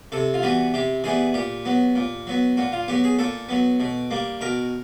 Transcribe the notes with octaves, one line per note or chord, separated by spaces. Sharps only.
C3 A4
F4
E3 G3 B3 F#4
C3 G4
E3 G3 B3 G#4
A#2 G4
F#3 B3
A#2
F#3 B3
A#2 F#4
F4
F#3 B3 G4
G#4
A#2 A4
F#3 B3
B2
G3 A#3
B2 A#4